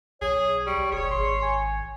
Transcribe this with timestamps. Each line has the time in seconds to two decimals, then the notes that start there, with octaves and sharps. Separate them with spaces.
0.22 B1 G#4 C#5
0.67 G3 C#6
0.92 E1 G#4 C#5
1.11 G#1 C6
1.42 G#5